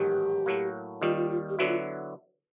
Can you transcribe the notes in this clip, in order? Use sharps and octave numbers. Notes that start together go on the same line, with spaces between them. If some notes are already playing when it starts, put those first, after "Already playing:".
Already playing: A1 G#2 D#3 F#3 B3 G4
A2 F#3 A#3
D#2 D#3 G3 F4
F4
F4
G4
D3 F#3 B3 E4 F#4
F4